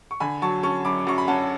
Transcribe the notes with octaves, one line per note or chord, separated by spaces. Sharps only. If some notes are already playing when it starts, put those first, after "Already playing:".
C#6
D3 G#5 B5
F#3 A5 C#6
C#4 A5 C#6
F#2 B5 D6
D6
F#2 C#6
B5
C#4 F#5 A5